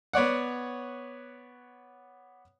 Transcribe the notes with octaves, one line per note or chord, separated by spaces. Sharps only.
B3 C#5 D5 F#5